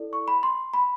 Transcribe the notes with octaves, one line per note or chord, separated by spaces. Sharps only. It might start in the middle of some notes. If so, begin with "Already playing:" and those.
Already playing: E4 A4 D5
C#6
B5
C6
B5